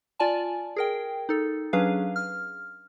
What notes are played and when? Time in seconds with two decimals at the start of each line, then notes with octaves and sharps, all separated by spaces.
0.20 F4 D5 G#5 A5
0.76 G#4 A#4 G5
1.29 D#4 A4
1.73 F#3 C#4 D4 G#4 B4 F5
2.16 F6